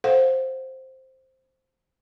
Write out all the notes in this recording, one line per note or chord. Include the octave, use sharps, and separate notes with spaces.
A4 C5 F5 F#5